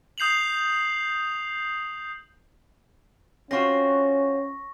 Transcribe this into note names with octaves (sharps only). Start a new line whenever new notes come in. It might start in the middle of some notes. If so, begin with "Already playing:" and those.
D#6 G6 C7 F7 F#7
C4 C#4 F4 F#4 C#6 A#6